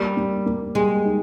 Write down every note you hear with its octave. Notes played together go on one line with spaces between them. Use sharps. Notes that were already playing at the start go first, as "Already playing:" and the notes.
Already playing: G3 A#3
A#3
A#3
G3 G#3
D#4